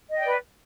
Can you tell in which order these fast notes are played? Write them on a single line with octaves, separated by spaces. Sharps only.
D#5 G5 D5 B4